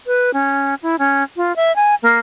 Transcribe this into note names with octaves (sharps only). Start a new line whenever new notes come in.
B4
C#4
E4
C#4
F4
E5
G#5
A#3